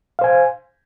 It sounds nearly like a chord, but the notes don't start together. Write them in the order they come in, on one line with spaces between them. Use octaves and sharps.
F5 C5 G#5